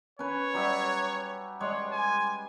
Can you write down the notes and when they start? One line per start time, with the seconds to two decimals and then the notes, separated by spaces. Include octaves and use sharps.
0.19 C#4 B4 C#5
0.54 F#3 G3 E5
1.60 G3 G#3 C#5
1.92 G#5